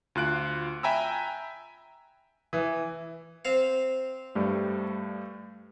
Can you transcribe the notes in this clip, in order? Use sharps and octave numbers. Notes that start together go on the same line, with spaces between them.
D2 F4 F#6 D7
E5 G5 G#5 A#5 B5 E6
E3
C4 C5 F5
G2 G3 A3